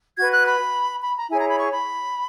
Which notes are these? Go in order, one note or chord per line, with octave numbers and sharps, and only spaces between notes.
F#4 B4 G#6
F#6
B5
B5
A#5
E4 G#4 C#5 G#5
A#5
B5
C#6
B5